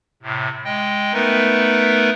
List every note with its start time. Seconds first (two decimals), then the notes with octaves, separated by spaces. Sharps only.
0.22 A2 C3
0.65 G#3 D#5 G5
1.13 A3 B3 D#4 A#4 B4